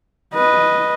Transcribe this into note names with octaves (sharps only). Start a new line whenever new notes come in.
B4 D#5